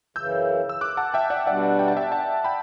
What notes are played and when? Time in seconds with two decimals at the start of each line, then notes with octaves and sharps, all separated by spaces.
0.16 F#2 C#3 E3 E6 G6
0.69 E6
0.81 D6 F#6
0.97 F#5 A5
1.14 E5 G5
1.30 D5 F#5
1.47 B2 G3 D4 F#4 D5 F#5
1.79 G5
1.88 A5
1.97 E5 G5
2.12 F#5 A5
2.44 G5 B5